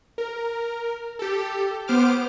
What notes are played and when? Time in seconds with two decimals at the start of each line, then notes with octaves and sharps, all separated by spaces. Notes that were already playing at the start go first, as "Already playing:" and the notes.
0.18 A#4
1.19 G4 A4
1.88 B3 C5 D6 F6